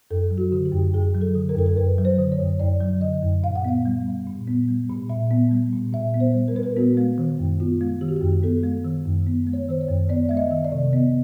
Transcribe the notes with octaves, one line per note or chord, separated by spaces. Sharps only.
F#2 A4
F#3
F#4
D3
G4
F#2
F#2 G#4
F#3
A4
D3
A#4
F#2 A4
A#4
F#2 B4
F#3
C5
D3
C#5
F#2
F#2 D5
F#3
D3 D#5
F#2
A#2 F5
F#5
B3 F5
G3
A#2
A#2
B3
G3
A#2
A#2 E5
B3
G3
A#2
A#2 E5
B3
C5
G3
A#4
A#2 B4
A#4
B3 F#4
G#3
D#3
F#2
B3 F4
G#3
D#3 G4
F#4
G4
F#2
B3 A4
G#3
D#3
F#2
B3
G#3
C#5
D#3 C5
C#5
F#2
B3 D5
G#3 E5
D#5
D#3
D5
C3
B3 D#5